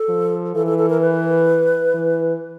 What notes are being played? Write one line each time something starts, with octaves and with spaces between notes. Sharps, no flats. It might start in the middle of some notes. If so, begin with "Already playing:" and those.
Already playing: A4
F3
E3 A4
A4
A4
A#4
B4
E3